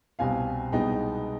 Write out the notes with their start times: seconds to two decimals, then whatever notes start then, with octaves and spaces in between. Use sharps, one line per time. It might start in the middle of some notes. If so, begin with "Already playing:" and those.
0.19 C2 B2 G3 C4 F5 G#5
0.72 C2 B2 G#3 B3 D#4 D#5 G5